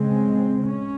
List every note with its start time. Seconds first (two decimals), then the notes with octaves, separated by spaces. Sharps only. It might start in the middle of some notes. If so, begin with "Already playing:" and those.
Already playing: C#3 G#3 C4
0.67 C#4